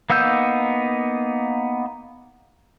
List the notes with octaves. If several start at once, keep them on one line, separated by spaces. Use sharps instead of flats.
A#3 B3 D#4 E6 G6